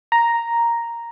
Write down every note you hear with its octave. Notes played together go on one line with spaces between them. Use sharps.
A#5